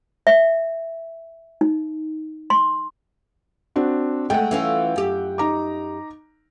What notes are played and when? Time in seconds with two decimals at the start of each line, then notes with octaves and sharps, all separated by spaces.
0.27 E5
1.61 D#4
2.50 C6
3.76 C4 D4 F#4
4.30 G#3 A3 F#5 G5
4.51 E3 C#4 F4
4.96 F#2 G4
5.38 D#4 A#5 D6